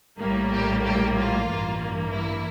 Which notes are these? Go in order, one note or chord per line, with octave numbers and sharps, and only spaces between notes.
A#1 A2 G3 A#3
G4
G4
F4
A1 G2 E3 A#3
E4